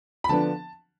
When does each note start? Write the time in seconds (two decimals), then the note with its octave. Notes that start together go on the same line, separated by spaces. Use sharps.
0.24 B5
0.29 D3 F3 B3 D4 A5